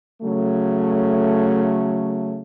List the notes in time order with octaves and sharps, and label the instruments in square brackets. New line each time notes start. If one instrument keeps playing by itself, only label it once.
[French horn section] C#3 F#3 A3